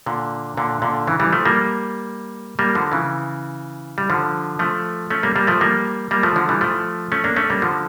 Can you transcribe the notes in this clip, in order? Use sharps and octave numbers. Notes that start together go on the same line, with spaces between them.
A#2 D3
A#2 D3
A#2 D3
C#3 E3
E3 G3
F3 A3
G3 A#3
G3 A#3
D3 F3
C#3 E3
G3
D3 F3
F3 A3
A3 C#4
G3 A#3
G3 A#3
F3 A3
G3 A#3
G3 A#3
F3 A3
D3 F3
E3 G3
F3 A3
A3 C#4
A#3 D4
A3 C#4
G3 A#3
D3 F3